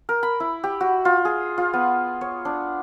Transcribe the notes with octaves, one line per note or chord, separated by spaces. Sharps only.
A#4
B5
E4
G4
F#4
F4
G#4
F4
B3
C#5
D4